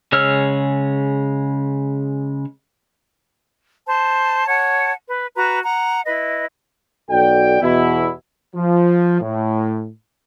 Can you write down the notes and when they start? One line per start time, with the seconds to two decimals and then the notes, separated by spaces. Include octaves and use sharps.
0.12 C#3 G#3 C#5 E6 F6
3.86 C5 A5
4.48 C#5 F#5 A5
5.08 B4
5.36 F#4 B4 A#5
5.63 F#5 A#5
6.06 E4 B4 D#5
7.10 B1 F#4 A4 D5 G5
7.62 E2 B2 E4
8.55 F3
9.21 A2